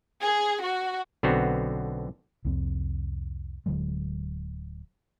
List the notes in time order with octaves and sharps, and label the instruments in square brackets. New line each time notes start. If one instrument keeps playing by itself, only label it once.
[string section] G#4
F#4
[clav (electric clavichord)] B1 D3 B3 C4 F#4
[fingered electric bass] C2 F2 C4
D1 D3 F#3 G#3